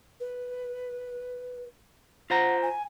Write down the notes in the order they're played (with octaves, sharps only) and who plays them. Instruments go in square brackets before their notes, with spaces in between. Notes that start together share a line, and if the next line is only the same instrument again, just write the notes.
[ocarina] B4
[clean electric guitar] F4 C5 A#5 [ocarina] F#5
[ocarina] G#5